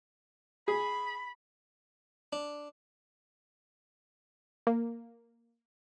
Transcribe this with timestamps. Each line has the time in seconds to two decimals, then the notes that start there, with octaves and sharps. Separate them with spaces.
0.68 G#4 B5
2.33 D4
4.67 A#3